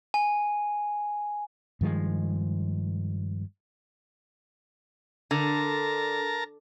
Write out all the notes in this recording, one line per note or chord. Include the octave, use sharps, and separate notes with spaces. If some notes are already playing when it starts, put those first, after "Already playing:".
G#5
G2 D#3 F3 G#3
D3 A#4 A5 A#5